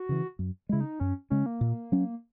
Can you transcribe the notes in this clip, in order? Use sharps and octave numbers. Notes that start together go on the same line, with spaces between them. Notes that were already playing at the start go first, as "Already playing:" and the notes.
Already playing: F#4
C#3 E3
F#2
C#3 G#3 E4
D#4
F#2 C#4
C#3 G#3 C#4
A#3
A#2
F#3 C#4